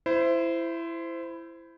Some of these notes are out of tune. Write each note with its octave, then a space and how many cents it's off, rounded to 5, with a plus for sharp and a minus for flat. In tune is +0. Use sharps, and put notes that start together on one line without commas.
E4 +15 C5 -15